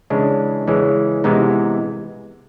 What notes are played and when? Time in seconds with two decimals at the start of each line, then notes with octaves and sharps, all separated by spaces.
0.10 C#3 E3 G#3 C#4 D4
0.67 C#3 E3 G#3 C#4
1.24 C3 E3 G#3 B3 D#4